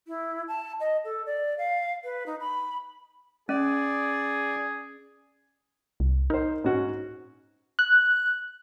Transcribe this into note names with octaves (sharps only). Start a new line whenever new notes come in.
E4
A5
D#5
A4
D5
F5
B4
D#4
B5
C#4 G#4 D5
C2
D#4 A#4 C5
G#2 C#4 F#4
F#6